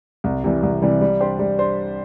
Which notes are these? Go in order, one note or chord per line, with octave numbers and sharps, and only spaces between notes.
C2
C3 E3 G3
C2
C3 E3 G3
G3
D4 G4 C5
G3
D4 C5